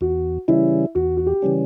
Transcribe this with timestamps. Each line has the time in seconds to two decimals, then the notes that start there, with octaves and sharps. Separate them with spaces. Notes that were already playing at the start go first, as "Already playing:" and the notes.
0.01 E2 F#4
0.48 C#3 E3 G3 C#4 E4
0.95 E2 F#4
1.17 F#4
1.26 G4
1.42 C#3 E3 G3 C#4